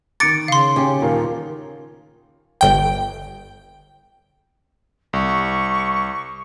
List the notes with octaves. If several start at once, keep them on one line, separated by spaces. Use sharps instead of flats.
D#3 D6 A6 C#7 D7
C#3 F5 C6
C#4 G4
D#1 D#3 F4 A#4
G1 G5
C2 C#6